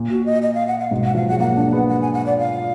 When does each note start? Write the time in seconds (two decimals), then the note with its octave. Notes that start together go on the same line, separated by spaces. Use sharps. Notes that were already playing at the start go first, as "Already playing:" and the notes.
Already playing: A#2
0.10 F#4
0.26 D#5
0.42 D#5
0.54 F5
0.67 F#5
0.79 F5
0.91 G#2 B2
1.04 F#5
1.15 F3 F5
1.23 F#3
1.28 F#5
1.32 G#3
1.40 F#3 A#3 F#5
1.57 A#3 D4
1.72 G#3 B3
1.89 F#5
2.02 G#5
2.13 F#5
2.26 D5
2.38 F5